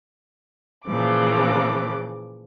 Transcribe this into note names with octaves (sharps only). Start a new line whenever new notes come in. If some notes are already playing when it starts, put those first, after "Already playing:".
A#2 C#3 E3 F3 D6